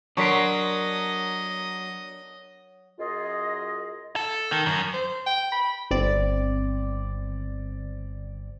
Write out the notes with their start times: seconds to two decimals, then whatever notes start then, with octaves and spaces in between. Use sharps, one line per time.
0.17 F#3 D4 A#4 D#5 C6 C#6 B6 D7
2.98 F#2 F4 G#4 D#5
4.16 A4
4.51 D#3
4.66 F#2
4.94 C5
5.26 G5
5.52 B5
5.91 G1 C4 D5